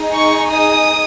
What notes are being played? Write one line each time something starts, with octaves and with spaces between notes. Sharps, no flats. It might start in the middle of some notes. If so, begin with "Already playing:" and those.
Already playing: D#4 G#4
C#6
D#6